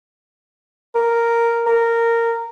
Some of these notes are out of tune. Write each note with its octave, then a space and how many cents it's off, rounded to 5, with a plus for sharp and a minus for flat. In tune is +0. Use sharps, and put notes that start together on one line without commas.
A#4 -5
A#4 -10